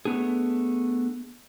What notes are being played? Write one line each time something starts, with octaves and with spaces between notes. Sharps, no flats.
A3 B3 D4 G#4